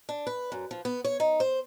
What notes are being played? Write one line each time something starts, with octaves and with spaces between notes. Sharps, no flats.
D4
B4
F#2
F3
B3
C#5
D#4
C5